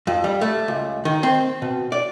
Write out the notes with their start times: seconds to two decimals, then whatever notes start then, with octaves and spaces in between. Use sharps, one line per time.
0.07 F2
0.24 G3
0.41 A3
0.68 C#2
1.05 D#3
1.23 C4
1.62 B2
1.92 D5